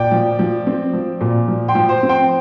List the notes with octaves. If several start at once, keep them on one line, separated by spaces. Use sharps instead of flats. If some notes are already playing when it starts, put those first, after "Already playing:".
Already playing: A#2 D5 G5
F3
F3
C4
F3
A#2
F3
G5 C6
F3
C5
C4
G5 C6